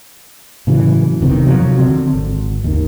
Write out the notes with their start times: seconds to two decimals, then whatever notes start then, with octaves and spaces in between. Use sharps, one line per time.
0.67 A2 C#3 E3 F#3
1.21 F#1 C3 D#3 B3
1.46 C3 F3 F#3
1.78 D3 C4
2.14 G#1
2.64 D#2 D#3